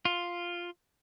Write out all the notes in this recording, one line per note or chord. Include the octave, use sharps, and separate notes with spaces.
F4